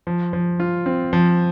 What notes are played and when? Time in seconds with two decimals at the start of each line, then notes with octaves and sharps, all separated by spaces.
0.07 F3
0.33 F3
0.60 F4
0.86 C4
1.13 F3